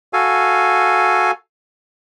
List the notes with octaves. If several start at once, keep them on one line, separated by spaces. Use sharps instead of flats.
F#4 A4 F5 G#5